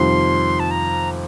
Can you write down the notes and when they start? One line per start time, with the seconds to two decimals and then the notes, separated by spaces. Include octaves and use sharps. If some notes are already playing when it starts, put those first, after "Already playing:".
Already playing: F2 C3 D#3 F3 G3 C6
0.60 A5
0.71 A#5